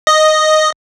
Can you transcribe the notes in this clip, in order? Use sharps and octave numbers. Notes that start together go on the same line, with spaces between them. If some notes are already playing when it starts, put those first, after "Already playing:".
D#5